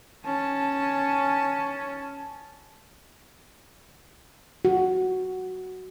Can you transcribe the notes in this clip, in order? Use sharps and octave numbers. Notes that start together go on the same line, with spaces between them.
C#4 A5
F#4